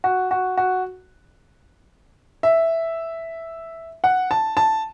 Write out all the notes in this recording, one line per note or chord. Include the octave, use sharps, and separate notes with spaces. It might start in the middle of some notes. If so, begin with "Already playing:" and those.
F#4
F#4
F#4
E5
F#5
A5
A5